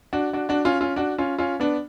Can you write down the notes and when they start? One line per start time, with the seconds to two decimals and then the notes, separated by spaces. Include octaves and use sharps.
0.13 D4 F#4
0.33 D4 F#4
0.49 D4 F#4
0.65 C#4 F4
0.81 C#4 F4
0.96 D4 F#4
1.18 C#4 F4
1.39 C#4 F4
1.60 B3 D4